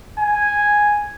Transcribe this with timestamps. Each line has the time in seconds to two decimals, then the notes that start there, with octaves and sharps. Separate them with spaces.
0.19 G#5